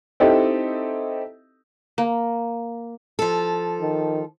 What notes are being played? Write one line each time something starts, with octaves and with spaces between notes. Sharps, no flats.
C4 D#4 E4 G4 A4 D#5
A#3
F3 A4
D#3